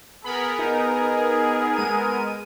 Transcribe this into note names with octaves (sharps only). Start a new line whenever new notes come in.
B3 G#4 A#4 B5
D#4
G#3 D#7